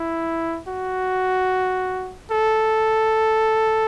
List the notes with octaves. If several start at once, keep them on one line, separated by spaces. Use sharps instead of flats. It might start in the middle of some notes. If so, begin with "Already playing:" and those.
Already playing: E4
F#4
A4